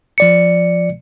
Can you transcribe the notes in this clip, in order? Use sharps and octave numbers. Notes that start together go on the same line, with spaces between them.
F3 D5 C#7